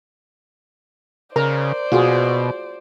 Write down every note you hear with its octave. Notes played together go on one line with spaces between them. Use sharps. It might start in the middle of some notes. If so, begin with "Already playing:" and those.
C#3 A#4 C5 D5 A#5
B2 F4 F#4 G#4